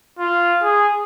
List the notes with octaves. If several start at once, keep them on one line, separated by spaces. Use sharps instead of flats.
F4
G#4